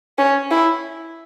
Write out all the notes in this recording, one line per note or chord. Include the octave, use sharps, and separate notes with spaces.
C#4
E4